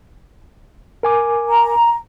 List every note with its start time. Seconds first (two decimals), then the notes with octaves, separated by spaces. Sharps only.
1.03 A#4 G#5 D6
1.48 A#5